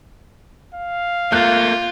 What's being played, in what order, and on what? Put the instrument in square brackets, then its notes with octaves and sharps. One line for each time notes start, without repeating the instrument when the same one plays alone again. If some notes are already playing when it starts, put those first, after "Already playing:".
[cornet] F5
[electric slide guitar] A3 A#3 [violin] F4 [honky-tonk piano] F#6 G6